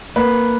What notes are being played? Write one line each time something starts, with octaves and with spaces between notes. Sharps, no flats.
A#3 B4